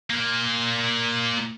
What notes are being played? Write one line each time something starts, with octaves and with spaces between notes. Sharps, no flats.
A#2 A#3